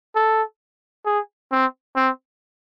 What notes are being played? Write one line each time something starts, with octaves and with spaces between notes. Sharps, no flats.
A4
G#4
C4
C4